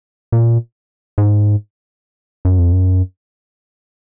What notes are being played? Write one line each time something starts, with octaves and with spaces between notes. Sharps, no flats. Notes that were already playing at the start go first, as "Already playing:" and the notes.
A#2
G#2
F#2
F2
F#2